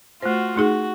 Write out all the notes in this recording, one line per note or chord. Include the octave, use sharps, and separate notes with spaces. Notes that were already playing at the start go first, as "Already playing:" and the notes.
A3 F4 F#4 C5
A3 D#4 F#4 G#4